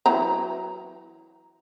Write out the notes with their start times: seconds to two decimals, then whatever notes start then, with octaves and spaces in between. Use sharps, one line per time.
0.06 E3 F#3 A#5